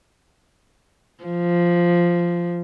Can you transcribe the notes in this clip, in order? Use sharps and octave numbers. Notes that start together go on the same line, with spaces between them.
F3